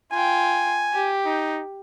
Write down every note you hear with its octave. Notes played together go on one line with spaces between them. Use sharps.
F4 G5 G#5
G4
D#4